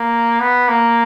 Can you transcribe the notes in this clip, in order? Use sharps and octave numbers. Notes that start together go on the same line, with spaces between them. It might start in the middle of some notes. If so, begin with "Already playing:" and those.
Already playing: A#3
B3
A#3